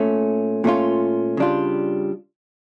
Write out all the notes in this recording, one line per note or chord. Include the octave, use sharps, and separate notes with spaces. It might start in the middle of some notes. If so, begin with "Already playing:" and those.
Already playing: A#2 A3 C#4
A#2 A3 C#4 F4
C#3 G3 D4 F4